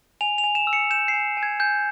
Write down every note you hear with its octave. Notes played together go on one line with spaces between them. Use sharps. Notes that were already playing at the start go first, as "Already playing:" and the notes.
G#5 F7
F7
G#5
E7
E6
C#7
G6 E7
C7
G#5
G#5
G#6
G#5 G6